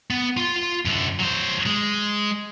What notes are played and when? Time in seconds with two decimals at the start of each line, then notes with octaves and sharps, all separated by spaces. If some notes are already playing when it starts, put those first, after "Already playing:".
0.10 B3
0.37 F4 C6
0.85 F#2 D3
1.19 F#3 C5
1.66 G#3